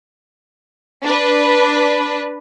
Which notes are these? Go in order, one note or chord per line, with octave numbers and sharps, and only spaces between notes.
D4 B4